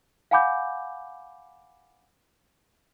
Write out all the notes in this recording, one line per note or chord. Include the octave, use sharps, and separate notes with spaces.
F5 F#5 G#5 B5 D6 G6